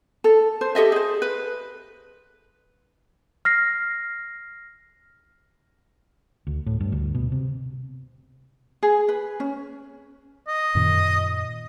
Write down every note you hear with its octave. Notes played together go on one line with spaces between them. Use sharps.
A4
C5
G4 A4 D#5 E5
G#4 C5
B4
F6 A#6 C7
D2
A2
G2
D2
B2
C3
G#4
B4
C#4
D#5
F#2 A#2 D#3